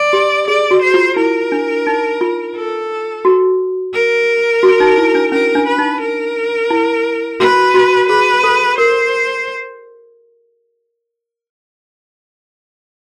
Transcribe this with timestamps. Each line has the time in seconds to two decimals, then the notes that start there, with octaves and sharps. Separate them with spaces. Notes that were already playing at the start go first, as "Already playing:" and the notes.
Already playing: D5
0.13 G4
0.48 G#4 D5
0.71 F#4
0.82 C5
0.94 F4
1.16 E4 A#4
1.52 D4
1.87 D#4
2.21 F4
2.55 A4
3.25 F#4
3.94 A#4
4.63 F#4
4.80 D#4
4.98 E4
5.15 D4
5.32 C#4 A#4
5.55 D4
5.67 B4
5.78 D#4
6.01 A#4
6.70 E4
7.40 F#4 B4
7.74 F#4
8.09 G#4 B4
8.44 A4
8.78 A#4 C5